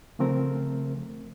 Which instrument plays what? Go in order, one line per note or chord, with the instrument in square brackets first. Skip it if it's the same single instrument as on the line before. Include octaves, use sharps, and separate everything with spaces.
[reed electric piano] C#3 F3 A3 C4 A#4